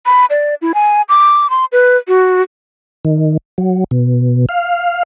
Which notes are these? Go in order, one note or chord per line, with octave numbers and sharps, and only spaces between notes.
B5
D5
E4
G#5
D6
C6
B4
F#4
D#3
F#3
B2
F5